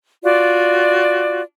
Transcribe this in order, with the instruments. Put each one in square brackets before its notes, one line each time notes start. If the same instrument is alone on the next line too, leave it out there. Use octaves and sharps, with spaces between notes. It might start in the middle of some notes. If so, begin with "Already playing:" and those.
[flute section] F4 F#4 D5